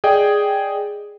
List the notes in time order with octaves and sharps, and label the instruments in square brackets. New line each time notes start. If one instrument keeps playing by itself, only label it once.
[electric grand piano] G#4 D5 D#5 G5